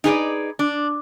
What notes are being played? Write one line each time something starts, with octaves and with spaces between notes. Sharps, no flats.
D#4 G#4 B4 D5
D4